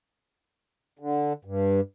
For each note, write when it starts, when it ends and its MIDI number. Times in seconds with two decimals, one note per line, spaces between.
0.99 1.33 50
1.45 1.80 43